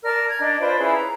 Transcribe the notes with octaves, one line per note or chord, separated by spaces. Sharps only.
A#4 D5 A5 F6
A#5 G#6
D4 D5 D#5
F4 B4 C5 D5
C#4 E4 G#4 B4
A#5